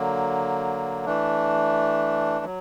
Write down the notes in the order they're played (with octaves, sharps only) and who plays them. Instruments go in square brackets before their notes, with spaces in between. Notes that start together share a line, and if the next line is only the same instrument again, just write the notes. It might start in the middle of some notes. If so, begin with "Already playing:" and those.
Already playing: [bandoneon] D3 F#3 A#3
E3 A3 D4
F#3